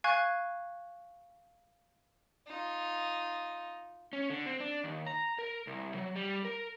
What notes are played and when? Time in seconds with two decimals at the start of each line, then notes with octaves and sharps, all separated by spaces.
0.04 F5 G#5 C#6 F#6 G#6
2.47 D#4 F4
4.13 C#4
4.30 D3
4.46 C4
4.60 D4
4.84 D#2
5.06 A#5
5.39 A#4
5.67 C2
5.94 F#3
6.16 G3
6.45 A#4